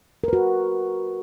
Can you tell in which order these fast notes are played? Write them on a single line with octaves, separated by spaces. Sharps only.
A#4 B4 F#4